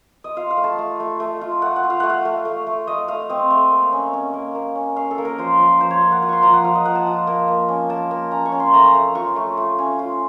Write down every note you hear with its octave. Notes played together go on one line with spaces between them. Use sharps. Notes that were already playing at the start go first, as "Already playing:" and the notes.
D#5
F4 F5
F5
A3
A5
A3
A3
A3
F4
A3 F#5
F#5
F4
F5
A3 F#5
F5
A3
A3
A3
A3 D#5
A3 F5
C4 D#5
A3
A#3
C#4
C#4
A#3
A#3
C#4
C#4 F5
A4
A#3
A#4
F3 C5
F3
F3 C5
C#5
A#3
F#5
F4
C6 C#6
F3 A#5
F#5
F3 F5
D#5
A#3 F#5
A5
F4
A#3
A#3
C#4
A#3 A5
A#3
C#4 A#5
C#6
C#4
C6
A3 A#5
A3
F4 C#6
A3
A3
C#4
F4